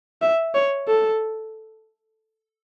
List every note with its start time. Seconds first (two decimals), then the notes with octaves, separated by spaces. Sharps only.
0.22 E5
0.55 C#5
0.88 A4